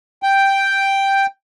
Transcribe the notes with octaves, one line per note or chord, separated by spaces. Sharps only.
G5